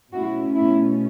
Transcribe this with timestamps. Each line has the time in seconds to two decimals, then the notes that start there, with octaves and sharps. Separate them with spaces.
0.12 B2 A3 C#4 E4 F#4
0.53 E4